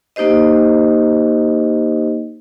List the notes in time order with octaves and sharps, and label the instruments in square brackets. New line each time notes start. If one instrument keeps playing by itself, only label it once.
[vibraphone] A#3 D#4 G4 C5 D#5